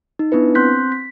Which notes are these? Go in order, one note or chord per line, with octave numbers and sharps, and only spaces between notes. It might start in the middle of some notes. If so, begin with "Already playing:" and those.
D#4
B3 D4 E4 B4
C4 C6 F#6 G6 B6
B6